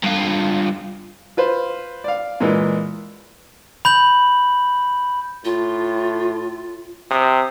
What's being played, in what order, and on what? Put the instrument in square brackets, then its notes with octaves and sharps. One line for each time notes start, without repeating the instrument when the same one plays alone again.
[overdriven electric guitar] G2 F4
[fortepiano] F4 B4 C5
D5 F5
A#2 E3 G#3
[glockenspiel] B5 G6 F#7
[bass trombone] A2 [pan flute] F4
[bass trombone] C3 [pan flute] D#6